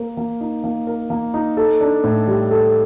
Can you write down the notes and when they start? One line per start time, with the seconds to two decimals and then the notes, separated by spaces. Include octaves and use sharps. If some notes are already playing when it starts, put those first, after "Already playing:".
Already playing: A#3 A#4
0.17 A#3
0.41 D#4
0.64 A#3
0.87 A#4
1.10 A#3
1.34 D#4
1.57 A4
1.81 D4
2.04 A2
2.27 G3
2.51 A4